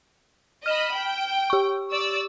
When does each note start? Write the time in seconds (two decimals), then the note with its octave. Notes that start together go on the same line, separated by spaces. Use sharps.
0.66 D#5 B5 F6 E7
0.95 G5
1.50 G4 C#6
1.92 D5 E6